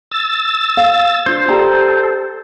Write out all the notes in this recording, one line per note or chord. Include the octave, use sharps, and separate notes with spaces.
E6 A6
F5
D4 F4 C5
G4 A4 D5 A#5